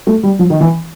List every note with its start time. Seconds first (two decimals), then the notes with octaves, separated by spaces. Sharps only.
0.07 A3
0.23 G3
0.39 F3
0.50 D#3
0.61 E3